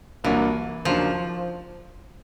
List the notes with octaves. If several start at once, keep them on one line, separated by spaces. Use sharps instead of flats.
C2 A#2 E3 F#3 A#3 D4
D#2 C#3 F3 F#3 A#3 D4